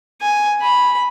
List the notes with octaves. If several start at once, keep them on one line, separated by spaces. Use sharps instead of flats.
G#5
B5